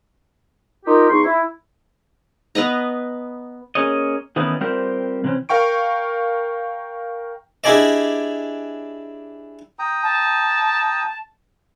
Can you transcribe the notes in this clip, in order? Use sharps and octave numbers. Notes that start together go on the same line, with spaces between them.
D#4 F4 G4 A#4
E2 D#4 C6 C#6
E4
B3 B4 D#5 A#5
A#3 C#4 G#4 C#5 D#5
D#3 E3 A3 B3 C#4 D#4
G3 C4 F4 G4 A#4 C5
C3 E3 C4 C#4
A#4 F5 G5 C#6 D7
D4 E4 G4 G#4 D5 D#5
G5 A#5 D#6
A5